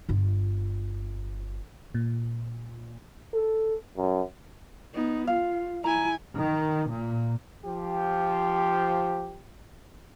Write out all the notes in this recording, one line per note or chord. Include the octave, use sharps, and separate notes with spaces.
G1 F4
A#2
A4
F#2
B3 D#4
F4 F5
E4 G#5 A#5
D#3
A#2
F3 G4